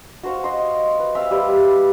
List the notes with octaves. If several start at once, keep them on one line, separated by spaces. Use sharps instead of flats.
F#4 C5 F5
D#5 C6
B4
C4 E5 F5 E6
G3 G4 B4